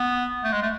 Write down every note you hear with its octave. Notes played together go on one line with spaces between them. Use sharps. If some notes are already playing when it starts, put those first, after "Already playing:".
Already playing: B3
A3
G#3
A3